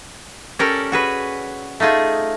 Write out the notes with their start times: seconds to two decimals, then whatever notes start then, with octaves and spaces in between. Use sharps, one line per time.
0.59 C#4 G4 A4 A#4 D5
0.92 F#4 G#4 B4
1.80 A3 D#4 F4 G#4